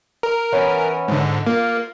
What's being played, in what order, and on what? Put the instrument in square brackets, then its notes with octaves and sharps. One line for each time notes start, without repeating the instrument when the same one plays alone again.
[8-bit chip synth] A#4
[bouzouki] E3 B3 C#4
[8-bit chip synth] G#2 D3
[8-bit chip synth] A#3 [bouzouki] F4